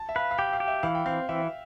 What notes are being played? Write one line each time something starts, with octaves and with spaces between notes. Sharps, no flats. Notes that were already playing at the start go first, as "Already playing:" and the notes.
Already playing: A5
E5
B4 F5
F5
G4 G5
F5
G4
E5
E3 F5
G5
C4 F5
E3 E5